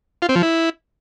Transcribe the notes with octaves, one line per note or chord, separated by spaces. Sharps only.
F4
C4
F3
E4